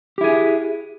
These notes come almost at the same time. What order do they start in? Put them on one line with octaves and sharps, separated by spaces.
G4 E4 G#4